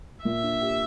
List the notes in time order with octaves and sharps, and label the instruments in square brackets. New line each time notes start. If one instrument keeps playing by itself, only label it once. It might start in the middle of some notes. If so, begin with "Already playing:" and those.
[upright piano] A#2 [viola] E5
[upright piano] D4
G4